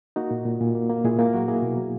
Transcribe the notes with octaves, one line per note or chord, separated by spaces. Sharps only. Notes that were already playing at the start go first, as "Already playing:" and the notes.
A#3 D#4 F#4
A#2
A#2
A#2
A#3
A#3
A#2 E4 G#4
A#3
F#3 F#4 A#4
A#3 E4 G#4
B2
F#3